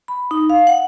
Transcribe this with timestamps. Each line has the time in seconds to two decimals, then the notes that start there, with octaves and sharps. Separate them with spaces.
0.08 B5
0.31 D#4
0.50 F5
0.67 F#5